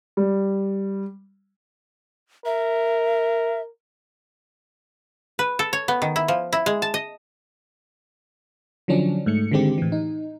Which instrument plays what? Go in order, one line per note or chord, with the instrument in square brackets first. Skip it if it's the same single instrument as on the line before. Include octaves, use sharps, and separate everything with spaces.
[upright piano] G3
[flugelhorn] A#4 [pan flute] E5
[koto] B4
A4
C#5
B3
D#3
E4
F3
E4
G#3
A5
D#5
[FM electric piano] D3 F3 F#3 C#4 D4
G#2 A3 C#7
D3 D#3 G#3 C4 G4
A2 E3
D#4